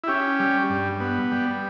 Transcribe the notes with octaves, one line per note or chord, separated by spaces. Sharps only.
E4
C#4 G4
G3
G2
B3
G3